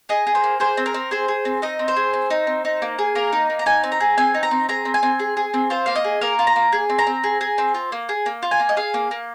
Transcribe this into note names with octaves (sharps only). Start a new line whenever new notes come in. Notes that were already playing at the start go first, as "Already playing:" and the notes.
G#4 D#5
G#4
C5
A#3
G#4 C5
C4
A#4
C4
G#4 C5
G#4
C4
D#4 D#5
C4
C5
G#4
C4
D#4
C4
D#4
A#3
G#4
A#3 A#4
D#4
A#3
A#5
D#4 G#5
C4
A#5
G#4
C4 G#5
D#4
A#5
C4
G#4 A#5
C4
G#5
C4
G#4
G#4
C4
F4 C5
A#3 F5
D#5
G#4
A#3 A#4
F4
A#5
A#3
G#4
C4
A#5
C4
G#4
G#4
C4
F4
A#3
G#4
A#3
F4
G#5
A#3
D#5
G#4 F5
A#3
A#3